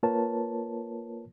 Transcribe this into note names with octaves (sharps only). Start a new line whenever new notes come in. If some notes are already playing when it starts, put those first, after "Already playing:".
A#3 F4 A#4 B4 C#5 A5